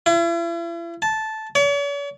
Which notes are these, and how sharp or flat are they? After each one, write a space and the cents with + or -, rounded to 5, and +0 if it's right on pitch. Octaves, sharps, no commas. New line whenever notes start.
E4 +45
A5 -10
C#5 +45